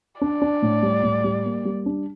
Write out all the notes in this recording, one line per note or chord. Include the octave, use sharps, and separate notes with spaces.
D4 D5
D4
A2
G3
A2
G3
A#3
G3
D4